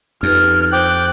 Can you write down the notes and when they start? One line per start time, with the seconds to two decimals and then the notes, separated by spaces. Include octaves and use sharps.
0.23 F2 D#4 G4 B4 F6
0.73 C5 G5 D6 D#6 F#6